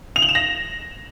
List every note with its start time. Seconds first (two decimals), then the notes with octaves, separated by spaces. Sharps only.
0.16 F7
0.22 F#7
0.29 E7
0.35 A#6